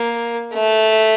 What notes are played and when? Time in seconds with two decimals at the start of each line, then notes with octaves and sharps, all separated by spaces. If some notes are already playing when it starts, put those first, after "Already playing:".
Already playing: A#3
0.54 A3